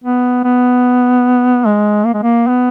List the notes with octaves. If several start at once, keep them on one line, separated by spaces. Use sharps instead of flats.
B3
B3
G#3
A#3
G#3
A#3
B3